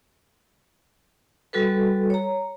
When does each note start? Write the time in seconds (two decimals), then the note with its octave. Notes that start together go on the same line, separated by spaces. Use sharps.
1.53 G3 F#4 A4 B4
2.10 C#5 A#5